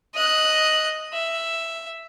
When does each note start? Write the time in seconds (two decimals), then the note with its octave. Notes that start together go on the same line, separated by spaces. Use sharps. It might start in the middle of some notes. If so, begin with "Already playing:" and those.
0.14 D#5 F#6
1.13 E5